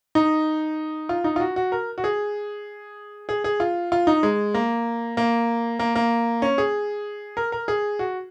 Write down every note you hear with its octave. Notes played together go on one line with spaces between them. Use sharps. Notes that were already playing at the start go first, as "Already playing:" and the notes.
D#4
F4
D#4
F4
F#4
F#4
A#4
F#4
G#4
G#4
G#4
F4
F4
D#4
G#3
A#3
A#3
A#3
A#3
C#4
G#4
A#4
A#4
G#4
F#4